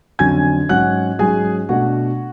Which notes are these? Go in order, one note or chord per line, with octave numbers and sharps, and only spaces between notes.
F2 D3 F#3 C#4 G#5 G#6
G#2 F#3 C#4 F#5 F#6
G#2 F#3 C#4 G#4 G#5
B2 A3 D4 F#4 F#5